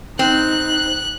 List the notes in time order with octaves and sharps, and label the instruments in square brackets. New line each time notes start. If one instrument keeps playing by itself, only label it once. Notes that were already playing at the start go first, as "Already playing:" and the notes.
[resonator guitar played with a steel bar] C4 [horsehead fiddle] D#4 [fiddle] F#6